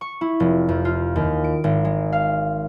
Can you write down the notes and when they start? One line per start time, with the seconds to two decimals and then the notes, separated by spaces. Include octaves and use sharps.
0.01 C#6
0.21 E4
0.40 F1
0.69 F2
0.85 F4
1.16 D#2
1.44 D7
1.64 G#1
1.85 G#3
2.12 F5